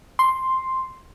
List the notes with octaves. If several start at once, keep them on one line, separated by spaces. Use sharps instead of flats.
C6